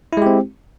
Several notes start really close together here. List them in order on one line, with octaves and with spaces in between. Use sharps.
E4 G#3 G4 C4